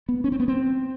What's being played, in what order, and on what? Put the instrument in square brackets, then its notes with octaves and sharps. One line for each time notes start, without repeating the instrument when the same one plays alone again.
[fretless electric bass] B3
C#4
C4
B3
C4